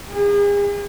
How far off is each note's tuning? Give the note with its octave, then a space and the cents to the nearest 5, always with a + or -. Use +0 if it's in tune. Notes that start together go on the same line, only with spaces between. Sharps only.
G#4 -40